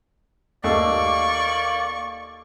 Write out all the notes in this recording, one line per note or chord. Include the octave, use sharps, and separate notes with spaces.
D#2 A3 A#3 D5 C#6 D6